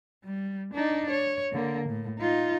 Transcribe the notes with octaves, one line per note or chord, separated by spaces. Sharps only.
G3
D4 D#4
C#5
D3 A#3
A2
D#4 F4